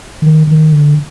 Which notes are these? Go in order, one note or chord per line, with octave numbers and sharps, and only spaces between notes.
D#3
D#3
D3